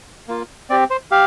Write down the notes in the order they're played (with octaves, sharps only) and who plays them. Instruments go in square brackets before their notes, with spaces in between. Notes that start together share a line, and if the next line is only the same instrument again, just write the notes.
[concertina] A#3 F4
C4 G4 D5
C5
G4 F5